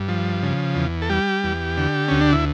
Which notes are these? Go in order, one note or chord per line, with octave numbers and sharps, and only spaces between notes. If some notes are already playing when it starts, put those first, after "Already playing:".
Already playing: G2
F3
C#3
E2
A4
G3 G4
E2
D3
D2 C#4
D4
E4